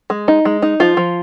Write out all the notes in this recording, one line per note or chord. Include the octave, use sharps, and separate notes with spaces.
G#3
D#4
G#3
D#4
F3 F4
F3